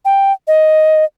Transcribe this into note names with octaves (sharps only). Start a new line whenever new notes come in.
G5
D#5